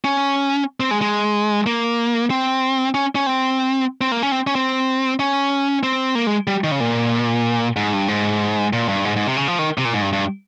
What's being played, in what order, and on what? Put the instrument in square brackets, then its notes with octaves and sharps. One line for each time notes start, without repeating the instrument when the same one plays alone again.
[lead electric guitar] C#4
C4
G#3
G#3
A#3
C4
C#4
C#4
C4
C4
A#3
C#4
C4
C#4
C4
C#4
C4
A#3
G#3
G3
D#3
C#3
A#2
G#2
G2
G#2
A#2
G2
G#2
G#2
C3
C#3
F3
D#3
C3
A#2
G#2
G2
G2